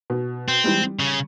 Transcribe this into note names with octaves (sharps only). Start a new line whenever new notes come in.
B2
C4
E3 G3 G#3
G3
C#3